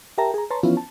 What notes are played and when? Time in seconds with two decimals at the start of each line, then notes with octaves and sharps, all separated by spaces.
0.18 G4 A#4 E5 G5 A5 A#5
0.34 G#4 A#5
0.50 B4 C#5 A5 A#5 C6
0.63 E3 F3 B3 C#4 E4 F4
0.77 A5